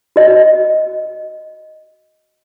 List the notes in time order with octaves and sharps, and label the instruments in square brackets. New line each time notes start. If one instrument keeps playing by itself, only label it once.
[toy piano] F#4 D#5